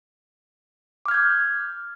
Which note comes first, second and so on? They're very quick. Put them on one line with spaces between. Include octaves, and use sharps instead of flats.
D6 F6 G#6 G6